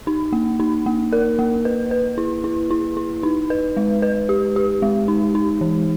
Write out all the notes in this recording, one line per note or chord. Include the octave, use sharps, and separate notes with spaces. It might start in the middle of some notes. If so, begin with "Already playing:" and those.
D#4
A#3
D#4
A#3
A#4
A#3
B4
B4
E4
E4
E4
E4
D#4
B4
G#3
B4
G4
G4
G#3
D#4
D#4
E3